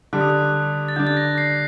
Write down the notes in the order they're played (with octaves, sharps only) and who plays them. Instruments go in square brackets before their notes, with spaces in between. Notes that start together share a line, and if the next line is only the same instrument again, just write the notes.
[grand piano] D3 G3 D4 [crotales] F#6
[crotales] D#6
F#6
A6
[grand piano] D3 G3 D4 [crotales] G6
[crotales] A6
A#6
C7